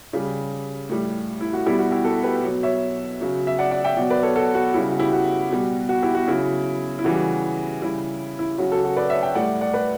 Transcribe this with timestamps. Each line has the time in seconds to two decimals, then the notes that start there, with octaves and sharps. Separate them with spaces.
0.13 C#3 G3
0.90 A2 G3
1.41 E4
1.53 F#4
1.66 B2 G3 E4 G4
1.79 F#4
1.92 E4 G4
2.05 F#4 A4
2.24 G4 B4
2.43 B2 F#3
2.63 C#5 E5
3.21 C#3 F#3
3.47 E5
3.59 D5 F#5
3.71 D5 F#5
3.84 E5 G5
3.97 B2 F#3 D5 F#5
4.10 B4 D5
4.23 A4 C#5
4.35 F#4 A4
4.55 F#4
4.74 C#3 G3 E4
4.91 F#4
4.99 E4 G4
5.13 F#4
5.51 B2 G3
5.89 F#4
6.03 E4 G4
6.15 F#4
6.28 C#3 F#3 E4
6.99 E4
7.04 C#3 E3 G3 F#4
7.82 C#3 G3 E4
8.39 E4
8.58 C#3 F#3 F#4
8.72 F#4 A4
8.84 F#4
8.96 B4 D5
9.10 C#5 E5
9.23 E5 G5
9.35 A2 G3 D5 F#5
9.61 D5 F#5
9.74 B4 D5